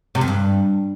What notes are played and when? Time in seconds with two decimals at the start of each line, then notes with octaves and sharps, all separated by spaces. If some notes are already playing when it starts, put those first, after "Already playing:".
0.15 C3
0.21 F2
0.28 G2